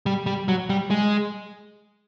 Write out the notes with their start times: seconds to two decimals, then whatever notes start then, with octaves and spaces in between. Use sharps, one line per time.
0.06 G3
0.26 G3
0.48 F#3
0.69 G3
0.91 G#3